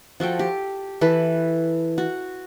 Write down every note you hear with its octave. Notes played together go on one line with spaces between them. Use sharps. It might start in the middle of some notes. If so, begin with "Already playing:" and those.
F3 F#4 A4 G5
G4
E3 A4 B4
F#4